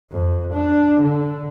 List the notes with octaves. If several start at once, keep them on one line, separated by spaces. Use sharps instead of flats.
F2
D4
D3